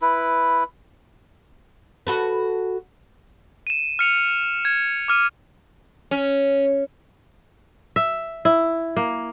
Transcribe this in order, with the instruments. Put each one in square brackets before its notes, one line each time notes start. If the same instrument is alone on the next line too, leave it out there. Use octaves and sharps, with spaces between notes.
[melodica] E4 B4
[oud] F#4 A4 B4
[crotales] D#7 E7
F6 C#7 F7
G#6
D6 F6 D#7
[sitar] C#4
[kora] E5
E4
A#3